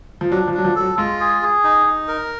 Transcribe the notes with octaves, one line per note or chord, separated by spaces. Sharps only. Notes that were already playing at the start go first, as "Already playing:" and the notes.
F3
F#3 D4
F3
F#3 D4
F3
A4
F#3
G#3 F4
G#4
G#4
D#4
D#4
A#4